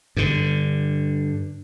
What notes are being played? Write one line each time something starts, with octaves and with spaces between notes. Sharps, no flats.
G2 D3